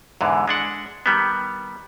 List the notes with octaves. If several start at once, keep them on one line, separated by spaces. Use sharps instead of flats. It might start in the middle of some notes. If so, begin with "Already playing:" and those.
E2 G#2 D3 E3
G#3 D4 F#5
D#3 G3 B3